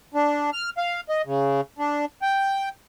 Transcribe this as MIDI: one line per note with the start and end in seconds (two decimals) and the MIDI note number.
0.14 0.50 62
0.53 0.70 89
0.78 1.01 77
1.09 1.22 75
1.26 1.61 49
1.79 2.05 62
2.22 2.69 79